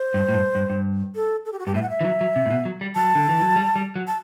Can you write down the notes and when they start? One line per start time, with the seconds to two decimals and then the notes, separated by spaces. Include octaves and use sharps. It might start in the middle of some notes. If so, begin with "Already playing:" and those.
Already playing: C5
0.14 G2
0.29 A2
0.34 G2
0.55 G2
0.70 G2
1.15 A4
1.45 A4
1.52 G4
1.59 F#4
1.66 G2 G4
1.74 A2 E5
1.82 F#5
1.90 E5
2.01 E3
2.05 F#3
2.21 F#3
2.36 C3
2.46 A2
2.50 B2
2.65 F#3
2.81 G3
2.95 F#3 A5
3.15 D3
3.29 E3
3.42 F#3
3.56 G3
3.76 G3
3.96 F#3
4.07 A5